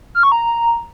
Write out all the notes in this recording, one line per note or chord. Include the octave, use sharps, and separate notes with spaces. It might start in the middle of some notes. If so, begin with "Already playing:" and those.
F6
C#6
A#5